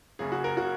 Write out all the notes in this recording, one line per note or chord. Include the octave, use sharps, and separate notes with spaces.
F#1 F#2 C#3 G#4
F#4
A#4
C#3 F#4